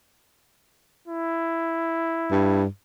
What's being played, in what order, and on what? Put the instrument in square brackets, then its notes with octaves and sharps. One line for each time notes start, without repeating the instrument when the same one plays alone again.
[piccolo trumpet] E4
[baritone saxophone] G2